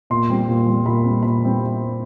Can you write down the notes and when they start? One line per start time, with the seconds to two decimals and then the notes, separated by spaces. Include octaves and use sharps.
0.10 A#2 C6
0.30 G3 C4
0.49 A#2
0.67 G3 C4
0.86 A#2 B5
1.04 G3 C4
1.22 A#2 B5
1.42 G3 C4